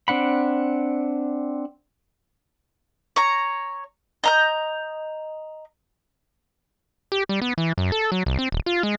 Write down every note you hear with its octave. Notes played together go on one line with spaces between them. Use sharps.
C4 D4 F#5 B5
C#5 A#5
D#5 A#5 G6
G4
G3
B3
E3
F#2
A4
F#3
C2
C4
D#1
F4
G#3